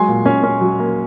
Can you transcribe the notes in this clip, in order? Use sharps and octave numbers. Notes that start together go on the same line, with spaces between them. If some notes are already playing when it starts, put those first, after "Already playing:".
Already playing: F#3 G#3 G#5 C6
A#2
C#4
C#4
F#3
A#3